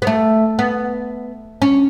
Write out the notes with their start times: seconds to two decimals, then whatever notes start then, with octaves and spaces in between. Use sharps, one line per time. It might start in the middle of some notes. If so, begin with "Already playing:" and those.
0.02 B3
0.07 A3
0.59 B3
1.62 C#4